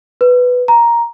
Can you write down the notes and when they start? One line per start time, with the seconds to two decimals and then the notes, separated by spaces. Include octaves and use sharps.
0.21 B4
0.68 A#5